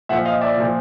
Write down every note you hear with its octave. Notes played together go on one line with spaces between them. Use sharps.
A#2 F3 E5 F#5
D#5 F5
D5 E5
A#2 F3